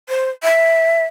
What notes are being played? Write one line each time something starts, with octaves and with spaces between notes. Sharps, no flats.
C5
E5